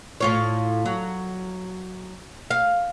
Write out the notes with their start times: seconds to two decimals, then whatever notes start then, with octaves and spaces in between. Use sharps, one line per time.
0.21 A2 F4 C#5
0.86 F#3
2.51 F5